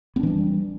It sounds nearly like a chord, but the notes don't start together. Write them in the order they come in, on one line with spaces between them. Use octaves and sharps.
B3 D4 E3 G3